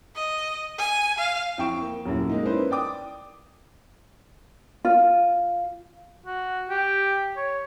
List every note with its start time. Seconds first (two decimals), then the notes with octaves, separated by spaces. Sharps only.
0.16 D#5
0.78 G#5
1.18 F5
1.58 F2 E4 G5 C#6 E7
1.82 A#3
2.06 D#1 F#2 E4
2.30 G#3 A#3 D#4
2.46 A#3 C#4 D#4 E4 B4 C5
2.71 D5 G5 D6 D#6
4.85 F4
6.26 F#4
6.70 G4
7.36 C#5